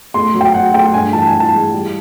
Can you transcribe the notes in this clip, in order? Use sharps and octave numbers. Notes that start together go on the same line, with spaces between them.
A3 C6
F#3
G5
F#3 F#5
A3 G5
G2 G#5
E3 A5
G#5
E3
A5
G#3
G3